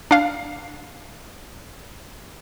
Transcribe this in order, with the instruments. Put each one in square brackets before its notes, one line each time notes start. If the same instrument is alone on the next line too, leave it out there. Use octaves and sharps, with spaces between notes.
[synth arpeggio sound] D4 F5